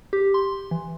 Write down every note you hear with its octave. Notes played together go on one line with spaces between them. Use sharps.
G4
C6
E3